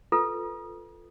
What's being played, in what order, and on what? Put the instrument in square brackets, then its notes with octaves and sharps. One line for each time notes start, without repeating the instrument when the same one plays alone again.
[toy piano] F4 A4 B4